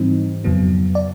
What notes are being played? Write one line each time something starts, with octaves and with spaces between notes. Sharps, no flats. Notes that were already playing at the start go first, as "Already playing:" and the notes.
Already playing: G#2 E3 G3 C4 D#4
F2 C#3 F#3 B3
D5